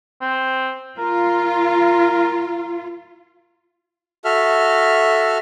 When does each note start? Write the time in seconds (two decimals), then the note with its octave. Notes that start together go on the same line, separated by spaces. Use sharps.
0.21 C4
0.98 F4 A#4
4.25 F#4 A4 E5 F6